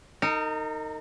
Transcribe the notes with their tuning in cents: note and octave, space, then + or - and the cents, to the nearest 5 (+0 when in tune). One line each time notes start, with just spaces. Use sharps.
D#4 +0 A#4 -35